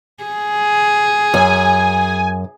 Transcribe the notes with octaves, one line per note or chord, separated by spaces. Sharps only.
G#4
F#2 G#5